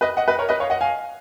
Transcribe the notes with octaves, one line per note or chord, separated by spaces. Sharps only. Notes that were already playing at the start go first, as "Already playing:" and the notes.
B4 D#5
D#5 F#5
B4 D#5
A#4 C#5
B4 D#5
C#5 F5
D#5 F#5
F5 G#5